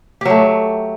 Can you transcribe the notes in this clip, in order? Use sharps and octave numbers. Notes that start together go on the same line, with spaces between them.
F#3 A3 G4